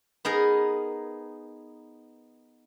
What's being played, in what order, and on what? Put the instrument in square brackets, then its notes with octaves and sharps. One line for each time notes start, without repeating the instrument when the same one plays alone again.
[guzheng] B3 D#4 G#4 A#4